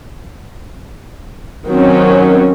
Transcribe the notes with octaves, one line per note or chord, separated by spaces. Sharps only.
D#3 F#3 C4 C#4